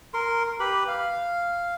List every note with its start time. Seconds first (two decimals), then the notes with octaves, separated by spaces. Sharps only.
0.14 A#4 C6
0.60 G4 B4 B5
0.88 F5